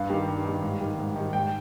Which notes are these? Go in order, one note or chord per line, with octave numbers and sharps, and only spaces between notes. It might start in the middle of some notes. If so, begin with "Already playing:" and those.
Already playing: G2 F5
D#3 G3
G2
D#3 G3
G#2
D#3 G3
G#2
D#3 G3
G#2 G5